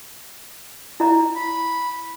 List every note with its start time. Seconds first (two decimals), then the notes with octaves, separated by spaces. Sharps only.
1.00 E4 D5 A#5
1.35 B5